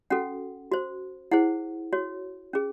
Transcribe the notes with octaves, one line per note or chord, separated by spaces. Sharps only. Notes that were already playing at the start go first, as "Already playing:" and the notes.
C#4 F#4 A4 F#5
F#4 C5
E4 G#4 C5 F#5
F#4 C#5
C#4 G#4